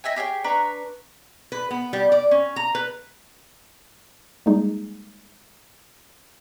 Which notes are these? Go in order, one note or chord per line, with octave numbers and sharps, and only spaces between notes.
D#5 E5 G5 G#5
G4 G#4 C#5 G5
D4 B4 A#5 C#6
B4
B3
G3
D5
C#4
A#5
B4
G3 G#3 A#3 D#4 G#4